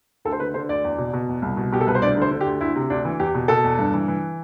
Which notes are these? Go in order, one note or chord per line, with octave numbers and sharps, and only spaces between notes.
D2 A4
C5
D3 B4
D3 C5
D2 D5
E2
B2
B2
E2
C2
B2
B2 G4
A4
C2 B4
C5
D2 D5
D3 C5
D3
G4
D2
D2 E4
C3
D2 D4
E3
E2 G4
B2
B2 A4
E2
G2
E3
E3